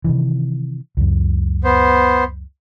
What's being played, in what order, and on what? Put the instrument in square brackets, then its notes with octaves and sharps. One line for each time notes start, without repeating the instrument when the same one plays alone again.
[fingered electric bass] C3 D#3 E3
C#2 F#2
[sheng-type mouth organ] B3 C5